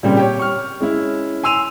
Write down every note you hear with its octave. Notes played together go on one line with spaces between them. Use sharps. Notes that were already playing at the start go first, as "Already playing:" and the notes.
A#2 C#3 G3 C4 G4
G4 C#5
C#6 F6
G#3 C#4 E4
G#5 C6 E6 D#7 F7